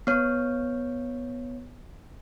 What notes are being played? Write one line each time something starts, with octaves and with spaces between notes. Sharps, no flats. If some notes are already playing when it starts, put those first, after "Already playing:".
B3 C#5